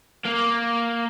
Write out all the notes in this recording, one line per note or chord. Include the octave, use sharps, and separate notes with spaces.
A#3